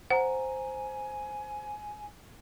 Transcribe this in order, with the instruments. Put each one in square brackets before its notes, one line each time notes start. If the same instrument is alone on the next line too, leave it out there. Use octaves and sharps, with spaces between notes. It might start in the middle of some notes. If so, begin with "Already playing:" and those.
[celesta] C5 A#5 [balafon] F#5 [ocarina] G#5